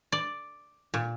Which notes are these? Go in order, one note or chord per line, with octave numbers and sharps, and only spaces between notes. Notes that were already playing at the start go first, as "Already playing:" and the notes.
D5
A#2